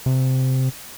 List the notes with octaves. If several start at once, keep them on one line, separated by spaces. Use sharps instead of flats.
C3